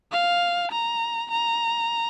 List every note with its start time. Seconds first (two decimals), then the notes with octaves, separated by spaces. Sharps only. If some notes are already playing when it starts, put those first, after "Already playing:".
0.12 F5
0.72 A#5
1.31 A#5